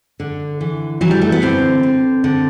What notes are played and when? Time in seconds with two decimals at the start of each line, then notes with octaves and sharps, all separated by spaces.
0.20 D3
0.61 E3
1.01 E3 F#3
1.11 G3
1.22 A3
1.32 B3
1.42 D3 C4
1.83 D3
2.24 D3